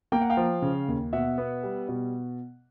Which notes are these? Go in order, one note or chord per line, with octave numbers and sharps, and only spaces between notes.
A#3 G5
F#5
F5 G5
F3
C#3
D#2
B2 E5 F#5
B3
G3
B2